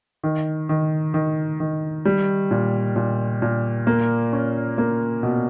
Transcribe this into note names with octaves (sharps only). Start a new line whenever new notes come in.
D#3
D#3
D#3
D#3
G3
A#2
A#2
A#2
A#3
C#4
A#3
B2